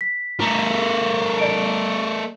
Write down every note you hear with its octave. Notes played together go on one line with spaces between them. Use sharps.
B6
A3 A#4
D5 D#5 D7